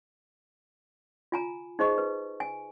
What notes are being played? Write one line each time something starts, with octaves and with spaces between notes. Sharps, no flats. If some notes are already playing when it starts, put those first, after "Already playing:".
F4 G#5 A#5
D#4 G#4 C5 D#5 C#6
B4
G#5